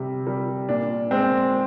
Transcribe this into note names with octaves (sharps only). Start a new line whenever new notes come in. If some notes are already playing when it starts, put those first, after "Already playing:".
Already playing: C3 G3
G3
A#2 D4
G#3 C4